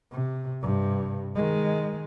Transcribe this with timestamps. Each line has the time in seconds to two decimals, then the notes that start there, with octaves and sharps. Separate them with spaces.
0.12 C3
0.62 G2 C3
1.35 D#3 G#3